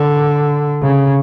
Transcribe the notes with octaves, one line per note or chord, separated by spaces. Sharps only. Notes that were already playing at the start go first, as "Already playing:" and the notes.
Already playing: D3
C#3